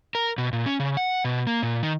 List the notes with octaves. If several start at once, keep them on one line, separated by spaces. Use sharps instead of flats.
A#4
B2
A#2
C#4
C#3
F#5
B2
A#3
A#2
D#3